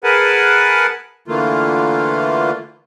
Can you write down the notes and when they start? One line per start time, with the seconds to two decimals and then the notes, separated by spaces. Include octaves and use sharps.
0.04 G#4 A#4 B4 F#5 G#5 A5
1.28 D3 E3 A3 A#3 F4